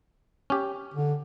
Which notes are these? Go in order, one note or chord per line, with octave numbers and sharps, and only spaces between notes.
C#4 G4
D3